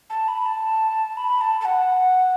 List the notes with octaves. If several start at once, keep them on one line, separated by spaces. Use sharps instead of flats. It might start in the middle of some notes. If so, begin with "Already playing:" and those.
A5
B5
A5
B5
A5
A5
F#5